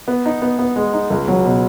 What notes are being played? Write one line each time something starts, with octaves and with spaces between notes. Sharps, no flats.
B3
D#4
B3
B3
G#3
D#4
C#2
F#3
B2